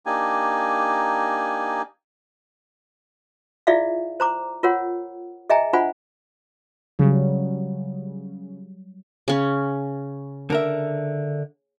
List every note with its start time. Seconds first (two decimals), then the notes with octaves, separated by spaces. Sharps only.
0.06 A#3 D4 D#4 G4 G#5
3.67 E4 F4 G#4 D5 E5 F5
4.20 C5 A#5 D6
4.63 F4 A#4 C#5 F#5
5.50 G#4 D#5 E5 G5 G#5 A#5
5.73 D4 F4 C5 F#5 G#5 B5
6.99 C#3 F#3 G3
9.28 C#3 C#4
10.50 D3 A#4 E5